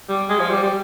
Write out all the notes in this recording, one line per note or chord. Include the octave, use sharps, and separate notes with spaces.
G3
G#3
F3
G3
G3